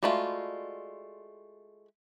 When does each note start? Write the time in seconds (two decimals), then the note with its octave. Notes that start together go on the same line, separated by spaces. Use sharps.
0.03 G#3 A3 F4 F#4 D5 B5